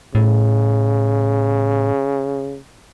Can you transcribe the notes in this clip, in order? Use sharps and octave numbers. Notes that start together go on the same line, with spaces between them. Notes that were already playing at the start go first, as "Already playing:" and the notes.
A2 C#3